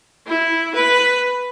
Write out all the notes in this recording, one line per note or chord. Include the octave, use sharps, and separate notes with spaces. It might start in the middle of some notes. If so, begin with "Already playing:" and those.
E4
B4